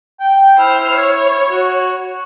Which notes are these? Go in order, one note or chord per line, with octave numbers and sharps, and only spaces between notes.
G5
E4 C5 F6
C#5
F#4